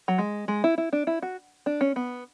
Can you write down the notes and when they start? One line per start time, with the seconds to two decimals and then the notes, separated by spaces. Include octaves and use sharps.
0.08 F#3
0.18 G#3
0.48 G#3
0.64 E4
0.78 E4
0.93 D4
1.07 E4
1.22 F#4
1.66 D4
1.81 C#4
1.96 B3